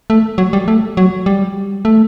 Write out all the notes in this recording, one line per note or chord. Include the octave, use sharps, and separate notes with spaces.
A3
F#3
G3
A3
F#3
G3
A3